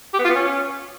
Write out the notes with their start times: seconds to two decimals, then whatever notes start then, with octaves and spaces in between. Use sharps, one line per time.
0.13 G4
0.19 B3
0.24 F4
0.30 B3
0.35 C#4